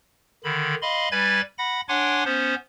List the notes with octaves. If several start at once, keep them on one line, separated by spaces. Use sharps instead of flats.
D3 D#3 B5
D#5 F5 B5 C6
G3 B4 G#5 B5 G#6 A6
F#5 B5 A#6
D4 C#5 F#5 G#5 C6 D6
B3 C#4 C5